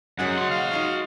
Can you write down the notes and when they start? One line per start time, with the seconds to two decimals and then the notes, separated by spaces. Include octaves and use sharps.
0.19 F#2 F#3 G#3 G#4 F#5
0.37 F#4 C6
0.51 F5
0.71 D#4 F4 A#5